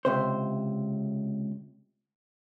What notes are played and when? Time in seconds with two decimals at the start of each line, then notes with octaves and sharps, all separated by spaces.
0.05 C#2 C3 C5